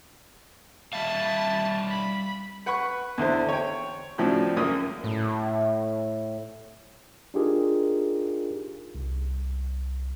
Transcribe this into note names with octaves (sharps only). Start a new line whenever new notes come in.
G3 E5 F5 A5 B5
B5
B4 F#5 B5 C#6
E2 D3 E4 C5
C#5 G5
A2 C#3 F3 C4 D4 F#4
C#2 F#2 A#3 C#4 G#5 D#6
A2
D4 D#4 F4 G4 G#4 A#4
C2